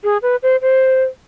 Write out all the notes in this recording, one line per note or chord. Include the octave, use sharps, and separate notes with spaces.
G#4
B4
C5
C5